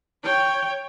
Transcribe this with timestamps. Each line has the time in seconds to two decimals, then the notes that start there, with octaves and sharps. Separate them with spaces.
0.23 C#5 G5